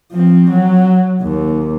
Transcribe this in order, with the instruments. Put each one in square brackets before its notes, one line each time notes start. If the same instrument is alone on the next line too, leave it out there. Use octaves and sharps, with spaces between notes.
[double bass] F3 C4
F#3
D#2